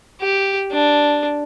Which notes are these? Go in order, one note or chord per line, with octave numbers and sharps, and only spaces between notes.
G4
D4